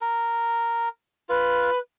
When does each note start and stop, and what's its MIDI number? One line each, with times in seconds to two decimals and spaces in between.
0.01 0.89 70
1.29 1.71 65
1.29 1.79 71